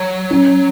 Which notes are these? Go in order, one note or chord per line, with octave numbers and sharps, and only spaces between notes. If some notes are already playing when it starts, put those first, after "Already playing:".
Already playing: F#3
C#4